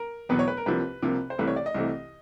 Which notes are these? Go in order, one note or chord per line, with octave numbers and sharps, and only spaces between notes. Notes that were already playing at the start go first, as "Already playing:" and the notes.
Already playing: A#4
E2 B2 F#3 B3 B4
C#5
B4
A#4
C2 C3 F3 A#3 B4
C2 C3 F3 A#3
C5
C2 C3 E3 A3 B4
C#5
D5
D#5
C2 C3 E3 A3